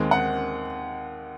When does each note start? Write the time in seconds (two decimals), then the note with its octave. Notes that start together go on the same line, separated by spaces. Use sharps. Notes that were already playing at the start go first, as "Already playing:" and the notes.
Already playing: D#2 D#3 G#3 C4
0.11 F#5